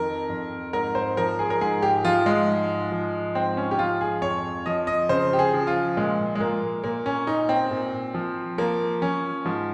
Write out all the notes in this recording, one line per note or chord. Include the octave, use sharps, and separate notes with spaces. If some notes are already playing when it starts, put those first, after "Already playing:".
Already playing: F2 D#3 A#4
F2
G#2 A#4
C5
F3 A#4
G#4
A#4
G#2 G#4
G4
F3 F4
G#3
G#2
F3
G#2 C4
C#4
G4
F3 F4
G#4
F2 C#5
F3 D#5
D#5
C#3 C5
G4
G#4
F3
F4
A#2 G#3
G#3
A#2 A#3
A#2 A#3
C#4
A#2 D#4
C4
A#2
F3
F3 A#3
F3 C#4
G#2 F3